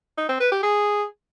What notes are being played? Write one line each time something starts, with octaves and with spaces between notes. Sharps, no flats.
D#4
C4
B4
G4
G#4